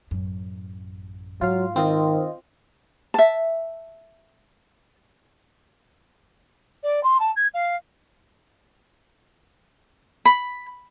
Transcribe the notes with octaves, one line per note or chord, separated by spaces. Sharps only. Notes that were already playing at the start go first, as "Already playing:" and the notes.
A1 F#2
G#2 F#3 F4 F5
D#3 C4 F4 D#5
E5 A5
D5
C6
A5
G#6
F5
B5